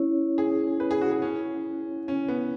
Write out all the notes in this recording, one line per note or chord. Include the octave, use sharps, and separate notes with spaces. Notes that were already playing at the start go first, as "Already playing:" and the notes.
Already playing: C#4 E4 C#5
G#4
B4
G#4
F#4
G#4
C#4
C#4
B3